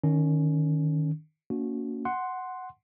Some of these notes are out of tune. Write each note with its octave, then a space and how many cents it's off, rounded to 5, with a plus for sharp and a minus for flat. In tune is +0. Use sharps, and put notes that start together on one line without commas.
D#3 -10 C#4 +10
A#3 -5 C#4 +40 F#4 -15
F#5 +0 C6 +0